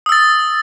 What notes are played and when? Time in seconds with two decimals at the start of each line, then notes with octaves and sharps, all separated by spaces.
0.06 D#6
0.09 E6
0.12 A6